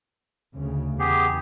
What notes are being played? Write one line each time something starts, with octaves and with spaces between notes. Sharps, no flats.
D2 C#3
E2 B3 G4 G#4